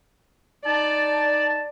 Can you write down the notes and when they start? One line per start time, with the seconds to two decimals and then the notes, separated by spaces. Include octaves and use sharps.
0.65 D#4 D5 A5